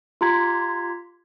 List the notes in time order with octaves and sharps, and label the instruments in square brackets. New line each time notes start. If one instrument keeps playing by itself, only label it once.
[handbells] F4 G4 A#5 C6 G#6 B6